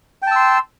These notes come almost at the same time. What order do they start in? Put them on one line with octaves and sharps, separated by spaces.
G5 A5 E6 C6